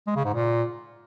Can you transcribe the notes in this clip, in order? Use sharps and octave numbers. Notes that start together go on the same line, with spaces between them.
G#3
C#3
G#2
A#2